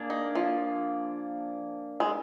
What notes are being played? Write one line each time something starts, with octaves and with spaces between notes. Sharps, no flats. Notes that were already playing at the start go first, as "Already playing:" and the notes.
Already playing: A#3 D4 G#4
D#4
F3
G#3